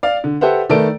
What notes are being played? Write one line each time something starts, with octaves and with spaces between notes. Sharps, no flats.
D5 F5
D3
G4 A4 B4 C5 E5 F#5
D#3 A3 A4 B4 D5 D7